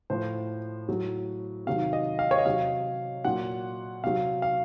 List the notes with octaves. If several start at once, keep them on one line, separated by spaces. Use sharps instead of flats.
A2 F3 C5
A2 F#3
C3 D#3 F#3 F5
D#5
F5
C#5
D#5
C3 F#3 F5
A#2 F#3 F#5
C3 F#3 F5
F5